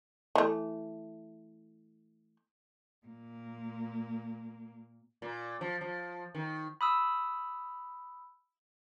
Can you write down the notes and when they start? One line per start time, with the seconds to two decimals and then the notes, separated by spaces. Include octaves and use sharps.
0.35 E3 A3
3.07 A#2 A#3
5.22 A#2
5.61 F3
5.81 F3
6.35 D#3
6.81 B5 D#6 E6